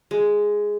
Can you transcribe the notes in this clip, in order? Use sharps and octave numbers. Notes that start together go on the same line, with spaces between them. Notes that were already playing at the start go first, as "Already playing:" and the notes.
G#3